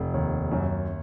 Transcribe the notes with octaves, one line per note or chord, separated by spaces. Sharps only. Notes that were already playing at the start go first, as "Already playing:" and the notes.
Already playing: F1
D#2
F#2